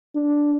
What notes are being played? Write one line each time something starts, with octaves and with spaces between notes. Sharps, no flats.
D4